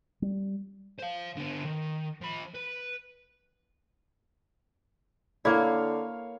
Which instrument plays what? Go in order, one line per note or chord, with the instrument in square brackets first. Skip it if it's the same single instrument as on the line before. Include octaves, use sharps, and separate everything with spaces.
[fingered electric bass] G3
[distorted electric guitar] C5 F5
D3 B3
D#3
F3 B5
B4
[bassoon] D3 [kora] A#3 E4 [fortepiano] C#5 F5